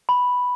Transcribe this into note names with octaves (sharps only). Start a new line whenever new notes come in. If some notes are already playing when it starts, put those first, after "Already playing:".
B5